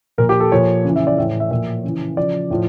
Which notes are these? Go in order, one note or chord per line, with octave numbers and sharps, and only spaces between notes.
A#2 F3 A#4
G4
A4
A#2 F3 C#5
C#3 E3
E5
D5
A2 E3 E5
E5
A#2 F3 E5
C#3 E3
C#3 F3 D5
A2 F3